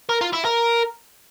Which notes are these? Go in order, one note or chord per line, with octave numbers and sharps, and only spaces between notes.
A#4
F4
E4
A#4